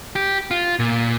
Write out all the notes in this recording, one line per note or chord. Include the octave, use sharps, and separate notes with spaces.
G4
F4
A#2